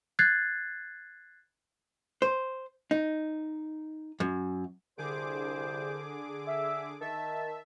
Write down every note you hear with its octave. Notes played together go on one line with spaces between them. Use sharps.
F#6 G#6 A6 C7
C5
D#4
F#2
C2 D3 G#4 C5 D6
E5
D#3 E5 A5